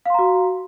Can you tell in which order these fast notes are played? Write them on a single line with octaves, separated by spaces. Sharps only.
F5 C6 A#5 F#4